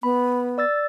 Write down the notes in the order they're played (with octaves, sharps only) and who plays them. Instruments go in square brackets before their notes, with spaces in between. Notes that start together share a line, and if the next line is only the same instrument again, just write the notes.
[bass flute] B3 [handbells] B5
[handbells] D5 E6 A6